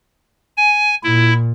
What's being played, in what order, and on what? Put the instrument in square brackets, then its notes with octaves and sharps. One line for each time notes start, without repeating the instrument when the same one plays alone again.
[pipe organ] G#5
[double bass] A#2 [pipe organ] E4